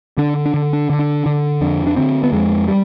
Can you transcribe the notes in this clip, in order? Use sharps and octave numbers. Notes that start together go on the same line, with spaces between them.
D3 D4
D4
D3
D4
D3
D4
D3
F2 D4
D4
D3 C4
B3
F2 G#3
G3